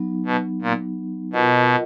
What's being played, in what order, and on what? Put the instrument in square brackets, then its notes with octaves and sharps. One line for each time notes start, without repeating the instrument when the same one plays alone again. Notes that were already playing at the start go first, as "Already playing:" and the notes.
Already playing: [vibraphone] F#3 B3 D#4
[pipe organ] B2
A#2
[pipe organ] B2 [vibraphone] F4 A#4 D#5 F#5